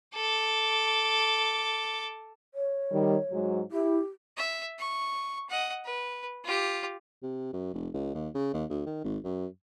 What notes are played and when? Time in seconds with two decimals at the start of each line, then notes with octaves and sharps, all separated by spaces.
0.15 A4 D6
2.54 C#5
2.92 D#3 G3
3.31 G#2 F#3
3.72 E4 G4
4.37 E5
4.79 C#6
5.49 D#5 F#5
5.85 B4
6.44 F4 G4
7.23 C3
7.53 F#2
7.74 F1
7.94 C#2
8.14 D#2
8.35 C#3
8.54 D#2
8.70 D2
8.86 D#3
9.04 G#1
9.24 F#2